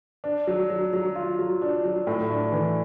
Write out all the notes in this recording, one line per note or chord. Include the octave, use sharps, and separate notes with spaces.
D4
F#3
F#3
F#3
F4
F#3
D4
F#3
A2
D4
E3